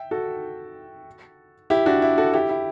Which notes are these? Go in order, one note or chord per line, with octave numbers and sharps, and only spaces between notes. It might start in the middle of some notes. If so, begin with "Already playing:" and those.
Already playing: E5 G5
F#4 A4
E4 G4
D4 F#4
E4
F#4 A4
E4 G4
E4